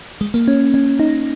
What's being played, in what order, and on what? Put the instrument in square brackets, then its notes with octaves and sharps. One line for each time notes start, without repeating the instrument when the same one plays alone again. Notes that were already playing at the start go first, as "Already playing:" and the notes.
[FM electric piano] G#3
A#3
C#4
C#4
D#4